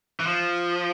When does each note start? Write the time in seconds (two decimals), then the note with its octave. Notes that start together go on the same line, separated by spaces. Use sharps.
0.20 E3
0.27 F3